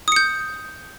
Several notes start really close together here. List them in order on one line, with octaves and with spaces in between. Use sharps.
D#6 C#7 G6